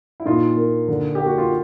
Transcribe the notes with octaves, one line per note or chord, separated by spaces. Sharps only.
E4
A#2 D#4 F4
A#3
D3
A#3 G4
F#4
F4